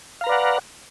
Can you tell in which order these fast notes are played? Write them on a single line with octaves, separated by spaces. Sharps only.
F5 A#5 B4 D5 F#5